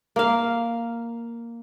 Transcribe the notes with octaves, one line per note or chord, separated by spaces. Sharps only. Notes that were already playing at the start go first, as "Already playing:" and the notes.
A#3 F5